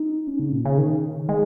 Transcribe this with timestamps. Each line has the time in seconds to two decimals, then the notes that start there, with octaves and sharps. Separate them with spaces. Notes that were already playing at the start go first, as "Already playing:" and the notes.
Already playing: D#4
0.27 C#4
0.39 C#3
0.52 A#2
0.65 C#3
0.78 D#3
1.29 G#3